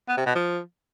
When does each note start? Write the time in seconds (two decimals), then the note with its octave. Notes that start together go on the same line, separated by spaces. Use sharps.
0.09 B3
0.17 C3
0.26 B2
0.35 F3